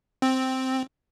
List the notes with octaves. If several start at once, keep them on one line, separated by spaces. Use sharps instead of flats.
C4